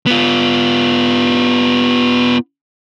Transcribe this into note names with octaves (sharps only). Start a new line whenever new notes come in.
B3 F4